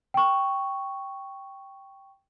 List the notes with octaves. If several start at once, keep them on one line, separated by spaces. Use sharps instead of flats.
G5 C#6